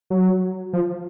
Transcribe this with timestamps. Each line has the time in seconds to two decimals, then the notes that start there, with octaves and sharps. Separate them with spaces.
0.10 F#3
0.73 F3